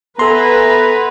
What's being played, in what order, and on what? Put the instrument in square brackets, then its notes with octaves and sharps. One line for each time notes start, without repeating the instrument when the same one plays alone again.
[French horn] B3 [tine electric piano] A4 C6 [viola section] B4 [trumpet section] E5 G#5 A#5